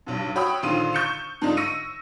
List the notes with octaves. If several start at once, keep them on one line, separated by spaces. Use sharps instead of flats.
B1 G2
F#4 C#5 G5 B5 D#6 E6
A#1 D3 D#3 F4 C6 D#7
C#6 G6 C#7 E7
G#2 D3 D4 D#4 F4
C#6 E6 A#6 C#7 D#7